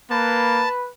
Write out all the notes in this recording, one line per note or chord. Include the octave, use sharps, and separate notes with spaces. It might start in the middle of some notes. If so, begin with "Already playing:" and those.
A#3 B4 A5